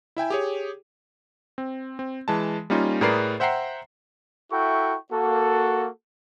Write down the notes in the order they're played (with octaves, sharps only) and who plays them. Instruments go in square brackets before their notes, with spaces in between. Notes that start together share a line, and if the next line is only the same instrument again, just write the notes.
[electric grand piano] E4 E5 G5 G#5
G4 G#4 C#5
C4
C4
E3 G#3 A5
G3 A#3 C#4 D#4 F4
A2 G#4 A#4 B4 D5 C7
C5 E5 F#5 G5 A#5 C7
[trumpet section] E4 F#4 A4 E5 G5 C#6
A#3 F#4 A4